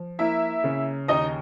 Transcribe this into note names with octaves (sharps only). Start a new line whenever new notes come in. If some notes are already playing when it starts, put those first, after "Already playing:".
Already playing: F3
A#3 E4 E5
C#3
D#2 D#4 D#5